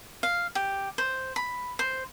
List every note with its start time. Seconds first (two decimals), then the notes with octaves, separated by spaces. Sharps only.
0.23 F5
0.55 G4
0.98 C5
1.36 B5
1.79 C5